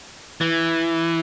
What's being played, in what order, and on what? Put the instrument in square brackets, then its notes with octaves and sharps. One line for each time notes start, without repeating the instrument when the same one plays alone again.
[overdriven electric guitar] E3